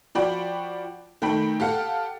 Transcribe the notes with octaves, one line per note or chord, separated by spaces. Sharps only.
F3 F#4 D5 G5 B5
D#3 A3 G5 B5
G4 A4 F5 F#5